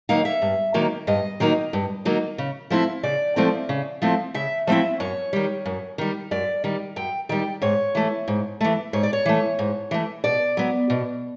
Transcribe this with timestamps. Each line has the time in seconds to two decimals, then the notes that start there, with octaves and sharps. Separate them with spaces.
0.09 D#3 F#3 A#3 D#4 F5
0.25 E5
0.42 G2
0.74 D#3 F#3 A#3 D#4
1.07 G2 D#5
1.40 D#3 F#3 A#3 D#4
1.73 G2
2.05 D#3 F#3 A#3 D#4
2.38 C#3
2.70 F3 A3 C4 E4
3.03 C#3 D5
3.36 F3 A3 C4 E4
3.69 C#3
4.02 F3 A3 C4 E4
4.34 C#3 E5
4.67 F3 A3 C4 E4 E5
5.00 F#2 C#5
5.33 D#3 G3
5.66 F#2
5.98 D#3 G3
6.31 F#2 D5
6.64 D#3 G3
6.96 F#2 G5
7.29 D#3 G3 G5
7.62 G#2 C#5
7.95 E3 A3
8.28 G#2
8.61 E3 A3
8.93 G#2 C#5
9.03 D5
9.13 C#5
9.26 E3 A3
9.59 G#2
9.91 E3 A3
10.24 B2 D5
10.57 F#3 B3
10.90 B2